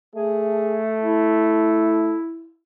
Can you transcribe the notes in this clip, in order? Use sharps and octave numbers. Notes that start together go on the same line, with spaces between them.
A3 G#4
E4